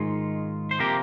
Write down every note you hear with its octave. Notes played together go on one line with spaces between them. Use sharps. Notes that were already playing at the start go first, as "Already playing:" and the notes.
Already playing: G#2 D#3 G#3 D#4 F4
C5
C3 F3 A#3 G4 A#4